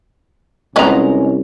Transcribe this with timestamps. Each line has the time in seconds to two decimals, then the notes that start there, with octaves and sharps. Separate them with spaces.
0.76 C2 F3 G#3 B3 C#4 F4 D#5 A#5